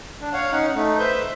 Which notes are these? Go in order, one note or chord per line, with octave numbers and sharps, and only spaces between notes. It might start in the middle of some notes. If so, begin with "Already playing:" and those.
D4
C#5 F5 F#5
C#4 D#4 F#5
A3 D#4
B4 C5 E5 G6